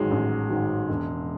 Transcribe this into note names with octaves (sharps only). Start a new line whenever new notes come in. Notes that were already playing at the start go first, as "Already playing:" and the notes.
Already playing: A1 G#2 D#3 F#3 G#3
A1
G#2 D#3 F#3
E1